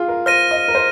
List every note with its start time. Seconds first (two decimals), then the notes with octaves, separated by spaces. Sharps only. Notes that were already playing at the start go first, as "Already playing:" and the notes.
Already playing: F4 G#4
0.08 A#4
0.26 C5 F6 A#6 D#7
0.51 D#5
0.68 A#4
0.75 C5